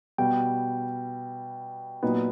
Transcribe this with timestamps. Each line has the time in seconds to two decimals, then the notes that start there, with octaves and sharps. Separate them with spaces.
0.18 B2 G3 B3 G5
2.03 A#2 F#3 B3 D#4